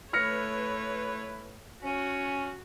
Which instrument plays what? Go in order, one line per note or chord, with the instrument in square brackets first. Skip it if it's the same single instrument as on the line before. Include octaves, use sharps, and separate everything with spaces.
[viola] A3 C#5 [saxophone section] E4 B4 [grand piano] F6 A#6 C#7
[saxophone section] C#4 [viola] F#4